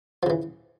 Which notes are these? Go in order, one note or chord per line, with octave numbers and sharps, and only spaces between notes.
C#3 E3 F3